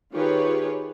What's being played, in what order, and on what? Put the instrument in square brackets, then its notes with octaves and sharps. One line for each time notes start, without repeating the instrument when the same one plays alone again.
[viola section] D#3 F4 G4 G#4 B4 C#5